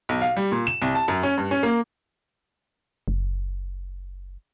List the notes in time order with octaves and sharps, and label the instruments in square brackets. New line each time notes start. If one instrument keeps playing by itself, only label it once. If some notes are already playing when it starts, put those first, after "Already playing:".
[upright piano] B1
F5
G3
A#2
E7
C2
A5
F#2
C#4
G2
C#4
A#3
[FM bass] F#1